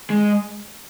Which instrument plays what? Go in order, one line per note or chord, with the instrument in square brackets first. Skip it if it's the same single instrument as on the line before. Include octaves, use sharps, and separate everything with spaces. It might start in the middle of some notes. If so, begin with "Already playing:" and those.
[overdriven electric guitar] G#3